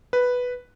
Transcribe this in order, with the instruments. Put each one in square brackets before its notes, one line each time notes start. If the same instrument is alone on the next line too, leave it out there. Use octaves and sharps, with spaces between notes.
[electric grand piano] B4